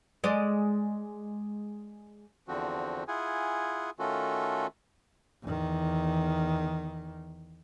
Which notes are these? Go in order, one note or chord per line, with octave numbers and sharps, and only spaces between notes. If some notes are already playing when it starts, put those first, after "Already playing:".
G#3 D5 D#5
E2 D3 F3 C4 F#4
E4 F4 G#4 F#5 G#5
D#3 A3 C#4 F4 F#4 A4
E2 D#3